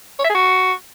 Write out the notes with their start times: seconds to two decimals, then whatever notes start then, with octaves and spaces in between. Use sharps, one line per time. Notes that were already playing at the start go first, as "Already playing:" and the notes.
0.19 C#5
0.24 E5
0.30 G#4
0.35 F#4